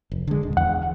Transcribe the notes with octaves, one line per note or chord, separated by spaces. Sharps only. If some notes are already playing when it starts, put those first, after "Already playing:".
F1
D3 G#3
D#1
E2 F#5